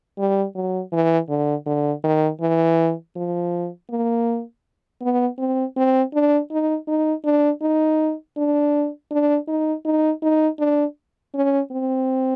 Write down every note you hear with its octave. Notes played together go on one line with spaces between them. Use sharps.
G3
F#3
E3
D3
D3
D#3
E3
F3
A#3
B3
C4
C4
D4
D#4
D#4
D4
D#4
D4
D4
D#4
D#4
D#4
D4
C#4
C4